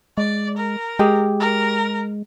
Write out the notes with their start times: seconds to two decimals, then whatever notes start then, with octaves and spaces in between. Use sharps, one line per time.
0.18 G#3 D5
0.57 A#4
0.99 G#3 G4 G#4
1.40 A#4